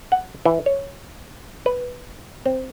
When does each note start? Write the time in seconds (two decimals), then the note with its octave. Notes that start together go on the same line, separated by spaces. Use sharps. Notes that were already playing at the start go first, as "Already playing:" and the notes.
0.12 F#5
0.45 E3
0.66 C#5
1.66 B4
2.46 C4